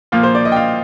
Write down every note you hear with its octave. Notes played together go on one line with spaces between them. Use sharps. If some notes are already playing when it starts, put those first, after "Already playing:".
A#2 F3 A#3 F4 F5
C5
D5
D#5
G5
F5